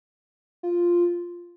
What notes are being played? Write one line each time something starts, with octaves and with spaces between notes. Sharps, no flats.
F4